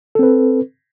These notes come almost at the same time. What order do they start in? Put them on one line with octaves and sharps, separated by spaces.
A4 C4 B4